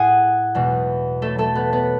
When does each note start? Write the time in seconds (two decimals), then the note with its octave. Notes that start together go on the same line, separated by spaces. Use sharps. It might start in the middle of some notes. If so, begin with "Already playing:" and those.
Already playing: A2 G#4 F#5 G#5
0.55 E2 B2 G#3
1.22 A3 A4
1.38 A3 A4
1.55 B3 B4
1.73 B3 B4